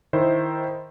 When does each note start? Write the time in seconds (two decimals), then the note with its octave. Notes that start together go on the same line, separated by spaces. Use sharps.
0.13 D#3 E4 C5